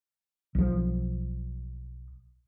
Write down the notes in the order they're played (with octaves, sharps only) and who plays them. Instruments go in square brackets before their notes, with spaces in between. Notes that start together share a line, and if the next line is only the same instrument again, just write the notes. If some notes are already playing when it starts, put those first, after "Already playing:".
[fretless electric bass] B1 F3